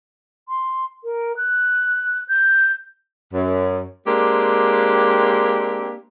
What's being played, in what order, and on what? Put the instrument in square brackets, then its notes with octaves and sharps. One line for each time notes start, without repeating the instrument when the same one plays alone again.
[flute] C6
A#4
F#6
G6
[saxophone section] F#2
G#3 A#3 C4 D4 G4